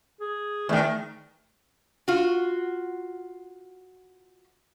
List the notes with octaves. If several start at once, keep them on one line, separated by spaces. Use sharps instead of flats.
G#4
E2 D#3 A3
F4 F#4